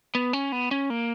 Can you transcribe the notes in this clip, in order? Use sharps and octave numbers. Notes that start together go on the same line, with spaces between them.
B3
C#4
B3
C#4
A#3